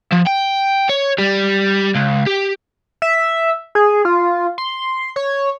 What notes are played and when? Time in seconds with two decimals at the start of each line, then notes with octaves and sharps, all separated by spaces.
0.13 F3
0.27 G5
0.89 C#5
1.18 G3
1.95 C#2
2.26 G4
3.02 E5
3.75 G#4
4.05 F4
4.58 C6
5.16 C#5